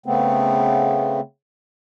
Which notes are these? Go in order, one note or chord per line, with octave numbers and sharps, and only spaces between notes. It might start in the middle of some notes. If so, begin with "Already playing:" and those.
C#3 A3 B3 C4